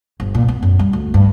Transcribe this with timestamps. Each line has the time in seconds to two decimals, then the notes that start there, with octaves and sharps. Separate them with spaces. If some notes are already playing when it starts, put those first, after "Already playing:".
0.20 G1
0.35 A#2
0.48 B3
0.63 F#2
0.79 G3
0.93 D2
1.14 G2